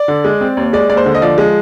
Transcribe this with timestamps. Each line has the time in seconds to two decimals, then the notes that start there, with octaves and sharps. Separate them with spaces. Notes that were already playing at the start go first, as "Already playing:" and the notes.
Already playing: D5
0.08 D3
0.24 G#3
0.41 C4
0.57 D#2
0.73 G#3 D5
0.89 D#2 D5
0.97 C5
1.06 D3
1.15 D#5
1.22 F3 D5
1.38 G#3